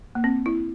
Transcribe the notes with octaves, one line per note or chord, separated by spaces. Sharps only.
A#3
C4
E4